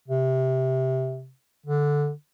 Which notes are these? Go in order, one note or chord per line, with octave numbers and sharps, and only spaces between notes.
C3
D3